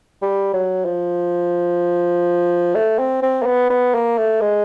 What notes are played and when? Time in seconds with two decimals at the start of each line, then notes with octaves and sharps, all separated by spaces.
0.22 G3
0.54 F#3
0.85 F3
2.75 A3
2.99 C4
3.23 C4
3.42 A#3
3.46 B3
3.70 B3
3.94 A#3
4.18 A3
4.41 G#3